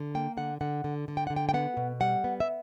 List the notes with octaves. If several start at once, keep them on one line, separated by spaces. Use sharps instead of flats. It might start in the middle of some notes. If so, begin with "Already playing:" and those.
Already playing: D3
A#3 G5
D3 F#5
D3 F#5
D3
D3
G5
D3 F#5
G5
G5
B3 F#5
B2
G3 F#5
B3
E5